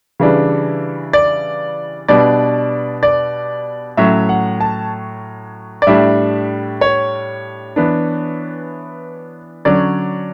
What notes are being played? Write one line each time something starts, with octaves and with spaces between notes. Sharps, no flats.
C#3 E3 G3 D4
D5
B2 G3 D4 D5
D5
A2 F#3 C#4 E5
F#5
A5
D5
A2 G3 D4 E5
C#5
E3 B3 D4
D3 F#3 C#4 D5